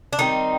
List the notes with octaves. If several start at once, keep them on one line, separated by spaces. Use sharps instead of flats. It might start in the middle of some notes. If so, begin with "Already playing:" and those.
D4
D#3 G3 C4 D#4